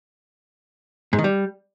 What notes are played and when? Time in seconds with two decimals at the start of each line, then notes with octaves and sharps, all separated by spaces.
1.13 G#2
1.18 D#3
1.24 G3